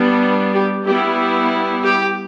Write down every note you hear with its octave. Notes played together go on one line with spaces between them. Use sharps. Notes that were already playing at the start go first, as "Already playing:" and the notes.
Already playing: G3 B3 D4
G4
G3 B3 E4 G4
G4